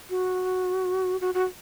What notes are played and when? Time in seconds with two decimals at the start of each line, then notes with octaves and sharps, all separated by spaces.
0.10 F#4
1.21 F#4
1.34 F#4